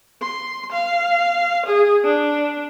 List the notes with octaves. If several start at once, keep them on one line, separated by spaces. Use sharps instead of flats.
C6
F5
G#4
D4